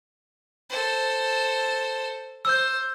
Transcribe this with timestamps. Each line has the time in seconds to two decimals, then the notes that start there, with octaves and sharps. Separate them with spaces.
0.70 A4 C5
2.45 C5 E6 G6